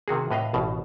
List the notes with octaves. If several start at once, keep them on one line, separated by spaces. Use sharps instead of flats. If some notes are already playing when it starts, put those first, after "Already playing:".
C3 D#3 F#4 G#4
A2 B4 D#5 F5
A1 B2 A5